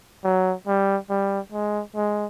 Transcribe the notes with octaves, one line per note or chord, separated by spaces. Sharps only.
F#3
G3
G3
G#3
G#3